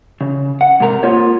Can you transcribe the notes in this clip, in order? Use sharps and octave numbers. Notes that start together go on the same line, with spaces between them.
C#3
F#5
G#2 C3 A#4 A#5
A#3 F4 F#4 C5 C#5